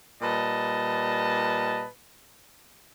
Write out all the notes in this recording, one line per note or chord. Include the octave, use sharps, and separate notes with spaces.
A#2 G3 B4 D#5 A5